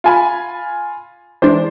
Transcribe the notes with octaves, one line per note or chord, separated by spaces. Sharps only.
F4 G#5 B5
E3 G#3 D4 C5